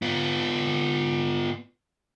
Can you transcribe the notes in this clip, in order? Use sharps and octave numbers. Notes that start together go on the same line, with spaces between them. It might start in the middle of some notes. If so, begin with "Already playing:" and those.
B3 F4